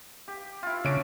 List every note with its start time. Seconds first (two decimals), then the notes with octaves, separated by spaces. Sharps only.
0.28 G4
0.63 E4 F4
0.85 C#3 C#4 D4 D7